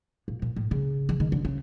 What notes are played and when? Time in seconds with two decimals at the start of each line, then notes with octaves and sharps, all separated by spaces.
0.28 A#2
0.42 A#2
0.56 A2
0.71 C#3
1.09 E3
1.20 D#3
1.32 D3
1.45 C#3